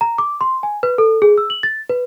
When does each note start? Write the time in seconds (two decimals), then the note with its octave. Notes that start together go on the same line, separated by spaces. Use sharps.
0.01 A#5
0.18 D6
0.41 C6
0.63 G#5
0.83 B4
0.98 A4
1.22 G#4
1.38 E6
1.50 F#7
1.63 A6
1.89 B4